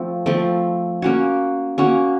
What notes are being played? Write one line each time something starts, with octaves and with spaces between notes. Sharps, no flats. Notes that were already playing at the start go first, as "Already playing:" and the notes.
Already playing: F3 A3 C4
F3 A3 C4
A#3 C#4 F#4
A#3 C#4 F#4